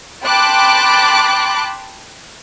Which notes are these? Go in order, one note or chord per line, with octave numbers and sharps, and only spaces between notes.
G5 A5 B5 C6 D6 F#6